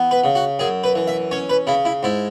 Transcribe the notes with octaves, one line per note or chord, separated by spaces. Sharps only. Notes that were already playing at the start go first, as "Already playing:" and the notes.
Already playing: E3 B3
B4
C#3
F#4
F#2 G#4
B4
E3
E5
C#4 C#5
B4
C#3 E4
E4
G#2 E4